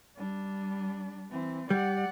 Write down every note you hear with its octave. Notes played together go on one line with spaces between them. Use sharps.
G3 D4
E3 C4
G3 D5 F#5